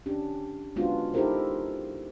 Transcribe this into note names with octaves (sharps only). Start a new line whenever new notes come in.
C#4 D4 G4
G#3 B3 C#4 D4 F4 F#4
D#4 E4 G4 A4 A#4 C5